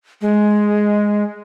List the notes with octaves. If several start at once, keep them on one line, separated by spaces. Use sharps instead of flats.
G#3